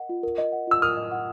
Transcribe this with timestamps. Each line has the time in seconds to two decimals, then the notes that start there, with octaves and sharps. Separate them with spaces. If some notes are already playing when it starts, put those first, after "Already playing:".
Already playing: A#4 D#5 F#5
0.09 F4
0.23 A#4
0.38 D#5
0.52 F#5
0.67 F4 E6
0.82 A#4 D#6 F6
0.97 D#5
1.11 F#5